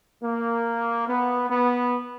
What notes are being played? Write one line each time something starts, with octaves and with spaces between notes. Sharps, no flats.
A#3
B3
B3